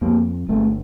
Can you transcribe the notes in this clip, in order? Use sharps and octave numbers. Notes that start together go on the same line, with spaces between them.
F2 A#3
G1 A3